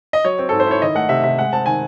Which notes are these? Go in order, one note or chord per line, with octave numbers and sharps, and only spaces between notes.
D#5
F#3 C#5
C4
G#2 A4
C5
E4 C#5
D#3 D#5
A3 F#5
C3 E5
C3 E5
G#3 F#5
C4 A5
D#3 G#5